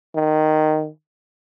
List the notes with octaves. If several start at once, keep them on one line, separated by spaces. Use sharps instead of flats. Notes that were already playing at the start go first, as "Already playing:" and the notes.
D#3